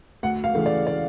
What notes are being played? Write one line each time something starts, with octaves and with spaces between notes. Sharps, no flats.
D2 F#5
F5
C#3 E3 A3
D5
D5